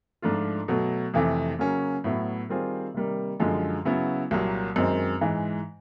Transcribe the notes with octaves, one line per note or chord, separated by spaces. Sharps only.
G#2 F3 A3 D4 F4
B2 F#3 A3
F2 C3 E3 A3
C#3 F#3 A#3 C#4
A2 F#3 B3 E4
D#3 G3 C4 F4 G#4
C3 D#3 G3 A#3
F#2 D3 F3 G#3
C#3 F#3 B3 E4
C2 A#2 F#3 A#3
F#2 D#3 G#3 C4 D#4
G#2 E3 G#3